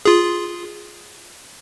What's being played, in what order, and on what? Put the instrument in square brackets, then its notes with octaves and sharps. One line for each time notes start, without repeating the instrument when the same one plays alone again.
[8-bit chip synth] F4 G#4